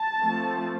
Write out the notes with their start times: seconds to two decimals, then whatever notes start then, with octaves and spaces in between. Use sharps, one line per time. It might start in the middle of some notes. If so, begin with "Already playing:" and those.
Already playing: A5
0.20 F3 A3 C4